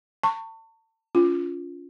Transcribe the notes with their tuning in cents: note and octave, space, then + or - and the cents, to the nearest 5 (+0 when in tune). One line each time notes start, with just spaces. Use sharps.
A5 +35 C#6 +0
C#4 +35 F4 +0